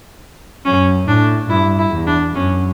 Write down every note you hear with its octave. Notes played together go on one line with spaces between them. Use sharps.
F#2 C#4
A2 D4
G2 E4
E4
E2
D4
F#2 C#4